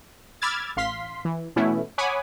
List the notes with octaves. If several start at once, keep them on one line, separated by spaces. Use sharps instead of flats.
B5 D6 E6 F6 G#6 A6
A1 F5 C6 B6
E3
B2 E3 A3 B3 C#4 E4
C#5 F#5 G#5 B5 D6 D#6